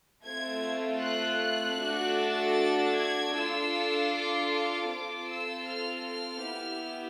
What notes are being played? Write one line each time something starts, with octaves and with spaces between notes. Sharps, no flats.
A3 C4 F4 G#6
F#6
F#6
A3 D4 F#4 A4
A6
G#6
D4 F4 A4 E6
D6
D6
C4 F4 A4 D6
E6
F6
F6
B3 E4 G4